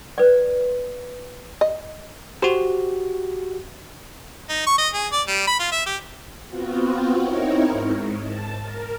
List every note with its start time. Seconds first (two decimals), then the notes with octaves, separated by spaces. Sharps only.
0.18 B4 D5
1.61 D#5
2.42 F#4 G4 C5
4.49 D#4
4.66 C#6
4.78 D#5
4.94 G#4
5.12 D5
5.28 G3
5.47 B5
5.60 F4
5.71 E5
5.86 G4
6.47 B3 C4 F4 F#4
7.20 C4 D#4 E4 A#4 C#5
7.70 G#2
8.23 A5
8.62 A#4